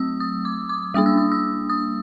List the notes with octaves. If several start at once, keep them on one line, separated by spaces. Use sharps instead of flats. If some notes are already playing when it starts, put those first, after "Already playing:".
Already playing: F#3 A3 C4 D#6 E6
D#6
D6
D6
G3 A#3 D4 D#6
E6
D#6
E6
D#6